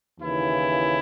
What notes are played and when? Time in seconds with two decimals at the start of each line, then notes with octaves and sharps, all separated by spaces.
0.20 D#2 C#3 E3 E4